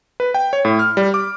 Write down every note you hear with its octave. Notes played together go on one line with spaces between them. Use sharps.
B4
G5
C#5
A2
F6
G3
D6